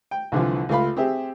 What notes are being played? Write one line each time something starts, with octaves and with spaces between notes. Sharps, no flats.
G5
C2 D3 E3 F3
C#2 A3 F4 F5 B5
C4 G4 G#4 E5